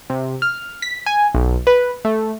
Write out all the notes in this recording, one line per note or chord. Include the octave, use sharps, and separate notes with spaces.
C3
F6
B6
G#5
B1
B4
A3